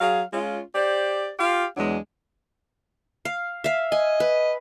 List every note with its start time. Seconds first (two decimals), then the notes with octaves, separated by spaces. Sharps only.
0.01 F#3 G#4 F5
0.33 G#3 C#4 F4
0.75 G4 C5 D5
1.39 F4 G4 F5
1.77 E2 F#3 G#3 D4
3.25 F5
3.64 E5 F5
3.92 D#5 G#5
4.20 B4